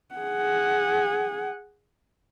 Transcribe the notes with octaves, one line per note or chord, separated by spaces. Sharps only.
G#4 F#5